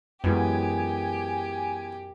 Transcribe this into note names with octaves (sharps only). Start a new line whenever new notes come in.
F#2 E3 G#3 B3 G4 G#5